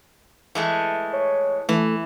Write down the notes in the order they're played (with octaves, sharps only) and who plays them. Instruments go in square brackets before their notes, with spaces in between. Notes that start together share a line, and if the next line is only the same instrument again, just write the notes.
[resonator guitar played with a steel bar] E3 G#3 A3
[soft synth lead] C#5
[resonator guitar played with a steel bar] E3 [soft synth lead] A3